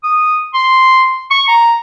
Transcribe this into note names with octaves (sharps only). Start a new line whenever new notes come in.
D#6
C6
C#6
A#5